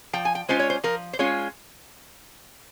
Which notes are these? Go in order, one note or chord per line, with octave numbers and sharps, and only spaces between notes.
F3 G5
G#5
G5
G#3 C#4 F4 C5
C#5
C5
F3 A#4
C5
G#3 C#4 F4 C#5